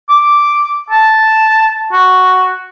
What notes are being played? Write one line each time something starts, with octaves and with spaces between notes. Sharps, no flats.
D6
A5
F#4